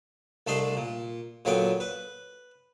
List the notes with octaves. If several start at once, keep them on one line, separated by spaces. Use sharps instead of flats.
C2 A3 D4 D#5 A#5 C6
A#2
A#2 D3 F#3 B3 D#5 G5
B4